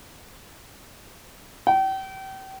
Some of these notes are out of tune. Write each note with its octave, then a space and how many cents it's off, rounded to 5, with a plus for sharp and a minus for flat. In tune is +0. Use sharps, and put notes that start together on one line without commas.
G5 -35